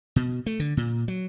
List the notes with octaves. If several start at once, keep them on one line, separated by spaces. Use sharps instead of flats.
B2
A3
D3
A#2
F#3